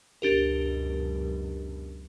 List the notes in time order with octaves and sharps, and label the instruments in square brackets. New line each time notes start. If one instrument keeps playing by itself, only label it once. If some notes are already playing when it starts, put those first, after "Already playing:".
[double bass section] C#2 F#2 B2 [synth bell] D4 G4 A#4